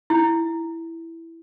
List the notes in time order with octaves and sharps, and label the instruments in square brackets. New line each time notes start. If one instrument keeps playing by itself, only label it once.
[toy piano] E4